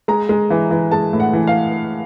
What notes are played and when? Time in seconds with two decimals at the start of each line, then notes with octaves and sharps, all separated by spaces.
0.08 G#3 A#5
0.29 G#3
0.50 E3
0.71 E3
0.91 G#3 A5
1.13 A2
1.20 F#5
1.33 E3
1.47 F5